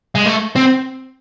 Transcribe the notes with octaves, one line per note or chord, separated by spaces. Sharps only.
G#3
A3
C4